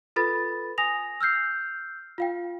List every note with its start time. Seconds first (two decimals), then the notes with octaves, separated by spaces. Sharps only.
0.16 F4 A4 B4 B5 A6
0.78 G#5 D#6 A#6 F7
1.21 E6 F6 G6 C7
2.18 F4 F5 G5